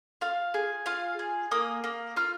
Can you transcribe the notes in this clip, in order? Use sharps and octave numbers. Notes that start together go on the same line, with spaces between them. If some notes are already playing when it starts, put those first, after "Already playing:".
F4 F5
G#4
F4 F5
G#4
A#3 D#6
A#3
F4 F6